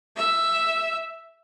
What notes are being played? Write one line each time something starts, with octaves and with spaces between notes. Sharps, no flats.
E5